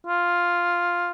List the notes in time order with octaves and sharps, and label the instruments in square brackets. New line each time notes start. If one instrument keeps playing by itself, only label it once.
[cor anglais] F4